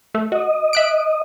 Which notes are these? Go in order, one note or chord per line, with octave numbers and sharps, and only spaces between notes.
A3
F#4 D#5
E5 F#6 D7